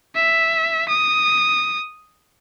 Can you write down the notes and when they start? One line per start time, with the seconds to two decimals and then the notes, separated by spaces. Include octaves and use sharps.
0.15 E5
0.89 D#6